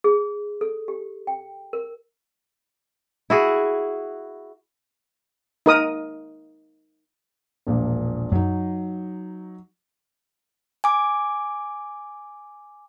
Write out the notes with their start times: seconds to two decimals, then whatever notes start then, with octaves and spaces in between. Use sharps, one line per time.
0.04 G#4
0.61 A4
0.88 G4
1.27 G5
1.73 A#4
3.30 E4 F#4 G#4
5.66 D#4 A#4 D#6
7.67 E1 A#1 A#2
8.32 F#2 F#3 D#4
10.84 G#5 D6